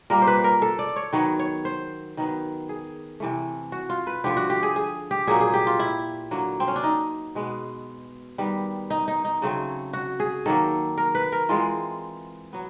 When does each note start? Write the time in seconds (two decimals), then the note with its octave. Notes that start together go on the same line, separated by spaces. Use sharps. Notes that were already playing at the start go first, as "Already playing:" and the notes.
0.10 A#2 G3 A#3 A#4
0.22 C5
0.27 B4
0.44 A#4
0.62 A4
0.79 D5
0.96 C#5
1.13 D#3 F#3 B3 C#5
1.39 C#5
1.65 C5
2.17 D#3 F#3 B3
2.69 G#4
3.20 C3 E3 A3
3.72 F#4
3.90 F4
4.07 B4
4.24 D3 F3 A3 G4
4.37 F#4
4.50 G4
4.63 G#4
4.76 G#4
5.11 G4
5.27 A#2 F#3 A#3 G#4
5.41 G#4
5.54 G4
5.67 F4
5.79 E4
6.31 D3 F#3 A#3
6.60 C4
6.68 C#4
6.76 D4
6.83 D#4
7.35 B2 G#3 B3
8.38 D#3 G3 B3
8.90 D#4
9.08 D#4
9.25 D#4
9.42 C#3 F#3 A3 C4
9.93 F#4
10.20 G#4
10.46 D#3 F#3 A#3 A4
10.97 A#4
11.15 B4
11.32 A#4
11.49 E3 G#3 C4 F4
12.53 F#3 B3